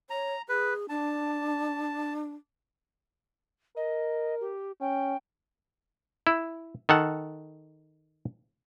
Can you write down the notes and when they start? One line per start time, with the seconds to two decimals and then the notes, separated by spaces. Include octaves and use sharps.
0.10 C#5 A#5
0.49 G#4 B4
0.89 D4 A5
3.77 A#4 D#5
4.41 G4
4.81 C#4 G5
6.27 E4
6.89 D#3 A4 F#5